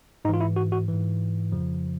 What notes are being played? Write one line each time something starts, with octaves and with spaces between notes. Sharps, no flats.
G#2 E3 D#4 F4
E4
F#4
F#4
G#2 E3
F2 C#3 F3